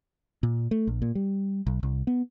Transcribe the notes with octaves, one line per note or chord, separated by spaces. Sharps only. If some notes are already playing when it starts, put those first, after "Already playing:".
A#2
A3
A#1
A#2
G3
B1
C2
B3